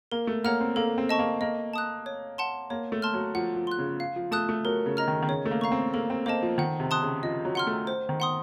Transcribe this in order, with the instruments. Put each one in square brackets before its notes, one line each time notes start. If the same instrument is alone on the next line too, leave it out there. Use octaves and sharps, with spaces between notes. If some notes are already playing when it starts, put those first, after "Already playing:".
[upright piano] A#3 [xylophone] A#4
[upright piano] A3
[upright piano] A#3 [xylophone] C#5 F#5 A#5 F6
[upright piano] C4
[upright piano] A#3 [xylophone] A4
[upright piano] C4
[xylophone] D#5 A5 C#6
[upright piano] A#3
[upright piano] A#3 [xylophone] D#5
[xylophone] A5 D#6 F#6
C#5
F#5 A5 C6
[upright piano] A#3 [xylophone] C#5
[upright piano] A3
[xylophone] A5 C6 F6
[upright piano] F#3
[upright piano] F3 [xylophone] F#5
[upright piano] F3
[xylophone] C6 F#6
[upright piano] C#3
[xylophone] F5
[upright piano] F3
[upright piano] A3 [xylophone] A5 D#6 F#6
[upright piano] A3
[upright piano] F#3 [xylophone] A#4
[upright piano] C#3
[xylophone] D#5 A#5 F6
[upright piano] D#3
D#3
[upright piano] C#3 [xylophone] C#5
[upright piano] A3
A#3
[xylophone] F5 A#5 C#6
[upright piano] C4
[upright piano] A#3 [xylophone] A4
[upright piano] C4
[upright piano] A#3 [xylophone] C5 D#5 A5
[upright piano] F3
[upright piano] D#3 [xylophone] F#5
[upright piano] C3
[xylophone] A5 C6 D#6 F#6
[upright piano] C#3
[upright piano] F3 [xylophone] D#5
[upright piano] F#3
[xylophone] F#5 C6 F6
[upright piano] A3
[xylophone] C5
[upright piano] D#3
[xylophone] F#5 C6 D#6